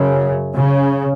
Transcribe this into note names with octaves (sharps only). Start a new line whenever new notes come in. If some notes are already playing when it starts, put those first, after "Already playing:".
Already playing: F#2 C#3
C#3